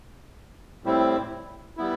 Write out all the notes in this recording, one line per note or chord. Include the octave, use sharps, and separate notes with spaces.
A2 G3 C4 E4
G3 B3 E4